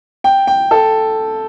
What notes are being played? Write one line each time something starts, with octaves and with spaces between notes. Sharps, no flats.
G5
G5
A4